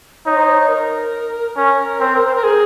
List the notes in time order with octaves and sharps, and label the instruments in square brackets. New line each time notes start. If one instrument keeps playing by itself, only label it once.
[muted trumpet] D#4 [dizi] C#5
[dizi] C5
C#5
C#5
A#4
[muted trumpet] C#4 [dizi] A#4
[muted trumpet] C4
[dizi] C5
A#4
G#4